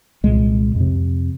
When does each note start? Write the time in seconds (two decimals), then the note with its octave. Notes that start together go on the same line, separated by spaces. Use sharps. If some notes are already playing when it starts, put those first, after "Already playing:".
0.23 C2 A#2 G#3
0.76 F2 C3